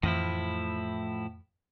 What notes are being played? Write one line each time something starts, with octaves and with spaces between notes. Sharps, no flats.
F2 A2 E3 F3 A3 E4